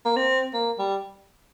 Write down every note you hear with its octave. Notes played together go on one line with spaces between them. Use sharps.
A#3
C4
A#3
G3